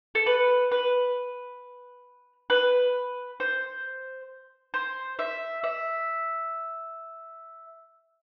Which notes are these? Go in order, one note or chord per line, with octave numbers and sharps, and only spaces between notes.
A4
B4
B4
B4
C5
C5
E5
E5